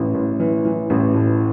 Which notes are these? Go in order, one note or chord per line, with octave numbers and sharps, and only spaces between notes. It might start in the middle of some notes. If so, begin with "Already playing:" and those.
Already playing: A1 E3
A1
E3
E3
A1
A2